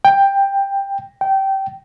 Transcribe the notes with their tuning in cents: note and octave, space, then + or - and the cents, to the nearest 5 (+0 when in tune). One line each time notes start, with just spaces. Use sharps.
G5 +10
G5 -20